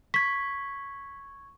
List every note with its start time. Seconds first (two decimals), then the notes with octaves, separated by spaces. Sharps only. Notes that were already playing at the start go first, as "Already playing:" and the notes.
0.14 C#6 G#6 B6